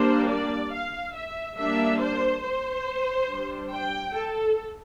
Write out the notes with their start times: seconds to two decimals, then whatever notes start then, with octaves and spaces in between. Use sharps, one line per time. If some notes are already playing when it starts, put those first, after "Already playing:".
Already playing: G3 A#3 D4 C5
0.29 D5
0.72 F5
1.14 E5
1.57 G3 A#3 D4 E5
2.00 C5
2.43 C5
3.28 G3 D4
3.72 G5
4.14 A4